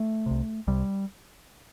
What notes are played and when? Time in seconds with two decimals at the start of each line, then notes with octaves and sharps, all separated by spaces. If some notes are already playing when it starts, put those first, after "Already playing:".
Already playing: A3
0.26 C2 C3
0.67 C2 C3 G3